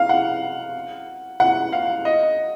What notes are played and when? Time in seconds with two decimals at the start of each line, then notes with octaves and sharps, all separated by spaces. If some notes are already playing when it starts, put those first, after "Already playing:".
Already playing: F5
0.09 F#5
1.40 F#5
1.73 F5
2.05 D#5